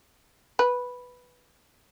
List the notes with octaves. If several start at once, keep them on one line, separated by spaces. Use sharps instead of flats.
B4